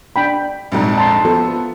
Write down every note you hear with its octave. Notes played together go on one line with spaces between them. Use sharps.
D4 G5 B5
A#1 F2 G#2
A5 C6
F3 B3 A4